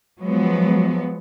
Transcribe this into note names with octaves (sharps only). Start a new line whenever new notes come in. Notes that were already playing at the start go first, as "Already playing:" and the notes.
F3 F#3 G#3 B3